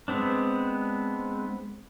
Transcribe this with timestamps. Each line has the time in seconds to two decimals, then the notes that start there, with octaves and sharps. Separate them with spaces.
0.08 G#3 B3 C4 D4